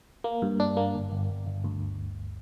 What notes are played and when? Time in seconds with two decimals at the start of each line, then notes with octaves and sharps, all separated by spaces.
0.24 A#3
0.42 G2
0.60 D4
0.77 A#3
0.95 G1
1.12 G1
1.29 G1
1.47 G1
1.64 D2